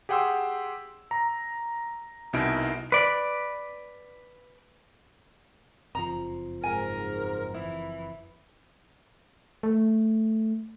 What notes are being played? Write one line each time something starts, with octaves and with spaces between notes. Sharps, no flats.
G4 G#4 F#5 G5 C6 E6
A#5
C2 B2 D#4 E4 D7
B4 D5
F#1 F2 F3 A#5
G#2 A#4 G#5
E3 E4
A3